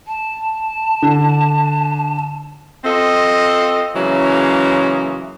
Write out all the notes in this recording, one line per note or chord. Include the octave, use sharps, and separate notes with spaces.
A5
D3
C4 F4 A4 D#5
C#3 E3 F#3 G#3 A#3